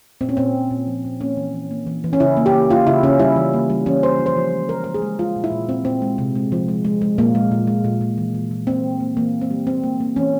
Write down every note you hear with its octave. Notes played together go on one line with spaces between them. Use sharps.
A#2 C4
C#4
A#2 C4
A#2
A#2
F3
A#2
A#3 C#4
E3
E3
A#3
E3
E3
C#4
C#3 E4
A#3
G4
A#3
A#3 F4
C#3 E4
C#3 C#4
G3 E4
E3
A#3
G3
E3 C#4
A#3 C5
F3
C5
F3
G#3
F3 A#4
G#3 A#4
G#4
G#3
G#3 F4
A#2
E4
A#2
A#2 C4
A#2 C4
G#3
C3
G#3
F3
G#3
G#3
G#3
A#2 A#3
G#3
A#2
G#3
A#2
A#2
E3
E3
E3
A#3 C4
E3
A#3
E3 A#3
G3
C4
G3
A#3 C4
A#3
A#3
E3 C#4